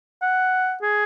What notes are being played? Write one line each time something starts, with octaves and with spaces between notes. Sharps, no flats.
F#5
G#4